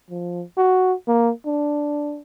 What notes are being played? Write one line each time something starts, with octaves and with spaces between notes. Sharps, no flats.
F3
F#4
A#3
D4